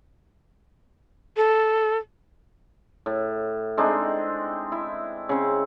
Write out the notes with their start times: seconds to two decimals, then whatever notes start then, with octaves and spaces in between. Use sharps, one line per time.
1.37 A4
3.06 A2
3.77 G#3 C4 D4 D#4
4.72 E4
5.29 C#3 C4